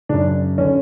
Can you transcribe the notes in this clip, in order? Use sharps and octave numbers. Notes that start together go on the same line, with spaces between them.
F#2 C#3 D4
D3 C#4